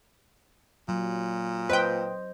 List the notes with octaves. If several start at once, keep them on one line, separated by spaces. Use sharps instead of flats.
A#2 F#3
B4 C5 D#5 G5